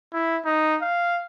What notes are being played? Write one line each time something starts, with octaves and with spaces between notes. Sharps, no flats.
E4
D#4
F5